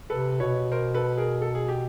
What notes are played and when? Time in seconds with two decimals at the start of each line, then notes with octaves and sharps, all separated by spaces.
0.09 C3 A4 B4
0.40 B2 B4 C#5
0.71 A#4 C5
0.94 A4 B4
1.17 G#4 A#4
1.42 A4
1.55 G#4
1.68 G4